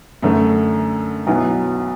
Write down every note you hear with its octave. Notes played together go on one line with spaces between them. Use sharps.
F#2 D3 A3
B1 B2 F#3 B3 E4